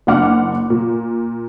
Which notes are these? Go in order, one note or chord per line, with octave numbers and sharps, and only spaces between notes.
F#1 D4 F#5 D6 F6
A#2